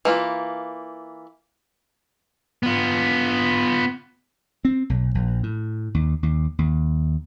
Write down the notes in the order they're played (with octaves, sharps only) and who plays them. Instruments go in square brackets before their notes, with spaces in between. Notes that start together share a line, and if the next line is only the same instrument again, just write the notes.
[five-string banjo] E3 A#3 F4
[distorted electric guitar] B3 F4
[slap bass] C4
B1
A#1
A2
D#2
D#2
D#2